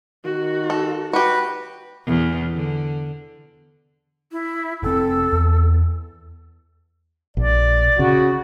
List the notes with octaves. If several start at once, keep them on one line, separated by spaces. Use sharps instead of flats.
D#3 F#4
A4
F#4 G4 B4
E2
D3
E4
F1 C4 A4
E2
A#1 D5
C#3 F#4